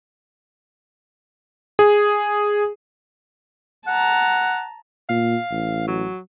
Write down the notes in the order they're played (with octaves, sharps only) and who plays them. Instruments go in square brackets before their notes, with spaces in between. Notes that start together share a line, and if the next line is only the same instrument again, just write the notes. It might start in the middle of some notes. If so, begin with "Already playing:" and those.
[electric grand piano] G#4
[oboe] F#5 [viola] A5 A#5
[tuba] A#2 [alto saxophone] F5
[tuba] A1
[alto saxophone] F#3